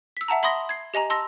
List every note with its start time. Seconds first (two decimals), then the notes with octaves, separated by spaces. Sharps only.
0.17 E6 B6
0.28 E5 F#5 A5 A#5
0.43 E5 B5 C6 D#6 A#6 G7
0.69 G#6 C7
0.94 G4 D#5 G#5 A#5
1.10 A5 C6 E6 A#6